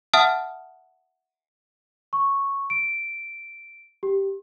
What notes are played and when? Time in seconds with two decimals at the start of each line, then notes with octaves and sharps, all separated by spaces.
0.14 E5 F#5 A5 D#6 F6
2.13 C#6
2.70 D7
4.03 G4